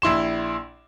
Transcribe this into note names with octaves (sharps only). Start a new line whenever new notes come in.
A#1 E4 C6 E7